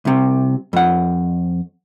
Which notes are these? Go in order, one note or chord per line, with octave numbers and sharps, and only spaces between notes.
C2 C3
F2 F#5